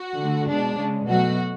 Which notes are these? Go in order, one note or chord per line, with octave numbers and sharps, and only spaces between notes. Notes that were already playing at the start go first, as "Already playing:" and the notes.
Already playing: F#4
D3 A3
B2 G#3 D4
C#3 G#3
B2 F#3 A3 F#4